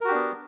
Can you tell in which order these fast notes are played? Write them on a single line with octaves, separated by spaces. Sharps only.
A#4 F#4 G4 D4 B3